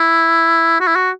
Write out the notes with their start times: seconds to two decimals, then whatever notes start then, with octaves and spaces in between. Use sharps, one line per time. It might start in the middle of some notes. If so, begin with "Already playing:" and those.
Already playing: E4
0.80 F#4
0.87 E4
0.96 F#4